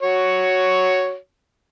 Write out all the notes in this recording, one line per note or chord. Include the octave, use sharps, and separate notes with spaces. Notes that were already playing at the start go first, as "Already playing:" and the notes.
F#4 C#5